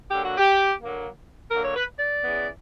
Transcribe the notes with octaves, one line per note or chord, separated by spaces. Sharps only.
D3 F#3 A#3 G4
F#4
G4
D3 F#3 A#3
D3 F#3 A#3 A#4
C#5
B4
D5
C#3 E3 B3